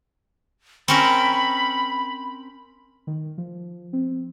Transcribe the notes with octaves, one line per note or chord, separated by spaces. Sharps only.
C4 C#4 A#4 B5
D#3
F3
C4